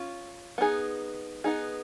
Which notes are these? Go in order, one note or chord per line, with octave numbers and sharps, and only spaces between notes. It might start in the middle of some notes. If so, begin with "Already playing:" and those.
Already playing: C#4 F4
B3 D#4 G#4
B3 D#4 G#4